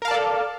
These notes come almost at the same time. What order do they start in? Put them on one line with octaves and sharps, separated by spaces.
A#4 F5 A5 D5 A4